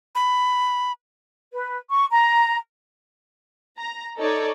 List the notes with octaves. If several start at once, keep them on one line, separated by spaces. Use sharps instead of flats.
B5
B4
C#6
A#5
A#5
D#4 A4 C#5 D5